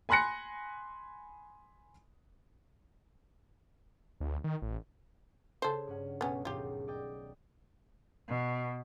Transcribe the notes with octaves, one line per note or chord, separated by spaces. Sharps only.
G#5 B5 C6 F#6 A#6 C#7
D2
D#3
A1
C#3 A4 C5 G#6
G2 C#4 F#5
B1 B2 B3 C#4
D#2 G#2 B2 F4 G4
D5 D#5 G5
B2